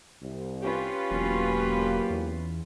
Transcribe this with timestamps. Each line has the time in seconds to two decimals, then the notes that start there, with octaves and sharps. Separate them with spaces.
0.23 C2
0.62 C#4 F4 G4 B4
1.11 E1 F#3 A#3
2.10 E2